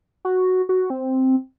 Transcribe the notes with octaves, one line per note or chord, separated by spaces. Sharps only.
F#4
F#4
C4